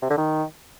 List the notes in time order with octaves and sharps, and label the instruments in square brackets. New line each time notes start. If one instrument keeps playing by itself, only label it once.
[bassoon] C3
D3
D#3